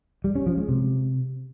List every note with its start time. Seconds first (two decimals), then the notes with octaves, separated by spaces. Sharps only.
0.24 G3
0.35 C#4
0.46 F3
0.58 G#3
0.69 C3